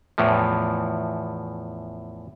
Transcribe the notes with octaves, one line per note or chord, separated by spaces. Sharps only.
E2 A2 E3 F3